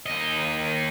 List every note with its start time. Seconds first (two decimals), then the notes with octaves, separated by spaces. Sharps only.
0.06 D#2 D#5